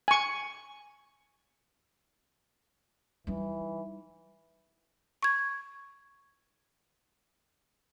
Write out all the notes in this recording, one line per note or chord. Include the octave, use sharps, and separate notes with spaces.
G#5 C#6
E3 G3 D#4
C#6 G#6